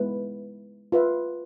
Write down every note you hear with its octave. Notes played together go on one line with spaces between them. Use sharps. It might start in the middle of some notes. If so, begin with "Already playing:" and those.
Already playing: G#3 B3 E4 B4
F4 B4 E5